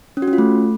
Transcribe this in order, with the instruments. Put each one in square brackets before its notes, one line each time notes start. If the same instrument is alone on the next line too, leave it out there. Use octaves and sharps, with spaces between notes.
[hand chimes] C#4
F#4
C#4
F4
A3